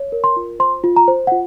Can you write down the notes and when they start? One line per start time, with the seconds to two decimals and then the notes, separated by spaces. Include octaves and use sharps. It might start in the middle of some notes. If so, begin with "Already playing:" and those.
Already playing: C#5
0.12 A#4
0.24 C6
0.36 F4
0.60 C5 C6
0.84 F4
0.96 A#5
1.08 C5
1.27 F#5
1.32 F4